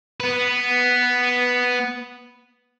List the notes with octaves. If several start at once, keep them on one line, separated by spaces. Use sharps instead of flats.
B3 B4